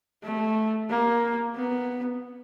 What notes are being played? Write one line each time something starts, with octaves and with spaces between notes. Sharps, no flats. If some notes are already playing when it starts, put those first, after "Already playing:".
A3
A#3
B3